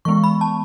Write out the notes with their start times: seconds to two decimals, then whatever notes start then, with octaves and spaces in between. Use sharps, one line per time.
0.05 E3 G#3 B3 C#6
0.24 B5
0.41 A5